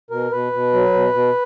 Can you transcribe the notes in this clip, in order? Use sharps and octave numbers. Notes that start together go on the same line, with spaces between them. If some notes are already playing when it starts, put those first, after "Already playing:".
B2 A#4
B2 B4
B2
F#3
B2
B2